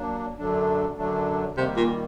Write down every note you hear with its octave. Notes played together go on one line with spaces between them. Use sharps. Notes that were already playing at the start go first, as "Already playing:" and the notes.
Already playing: F#3 A#3 D4
F#2 D3 F#3 A3 D4
F#2 D3 F#3 A3 D4
C3 D#3 G3 A#3
A#2